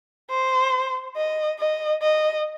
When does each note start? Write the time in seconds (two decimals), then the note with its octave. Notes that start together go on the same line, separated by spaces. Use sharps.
0.30 C5
1.16 D#5
1.59 D#5
2.02 D#5